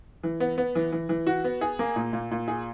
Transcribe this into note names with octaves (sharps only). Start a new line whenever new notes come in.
E3
B3
B3
E3
E3
E3
F#4
B3
G#4
A#3
A#2
A#2
A#2
G#4